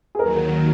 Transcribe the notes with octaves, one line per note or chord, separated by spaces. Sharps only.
G#4
D#2 D#3 F#3 A#4